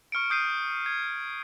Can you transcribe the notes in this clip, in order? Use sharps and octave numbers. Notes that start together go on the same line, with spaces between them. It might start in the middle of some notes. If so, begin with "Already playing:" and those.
C#6 F6 C#7 D7
D#6 G6 C7 D#7
G#6